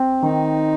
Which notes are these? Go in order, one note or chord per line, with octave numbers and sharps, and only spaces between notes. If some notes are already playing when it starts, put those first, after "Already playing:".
Already playing: C4
D#3 D#4